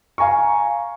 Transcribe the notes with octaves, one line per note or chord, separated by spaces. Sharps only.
F5 G#5 A#5 C#6